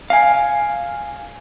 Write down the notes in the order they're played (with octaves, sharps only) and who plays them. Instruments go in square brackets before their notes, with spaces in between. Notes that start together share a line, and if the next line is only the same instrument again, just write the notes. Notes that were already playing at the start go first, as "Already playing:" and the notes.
[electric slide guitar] F5 G#5